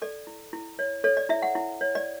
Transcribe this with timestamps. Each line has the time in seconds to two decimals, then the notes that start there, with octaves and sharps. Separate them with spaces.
0.02 A4 D5
0.27 E4
0.53 E4
0.79 C#5
1.04 A4 C#5
1.17 D5
1.29 E4 E5
1.42 F#5
1.55 E4
1.81 C#5
1.95 D5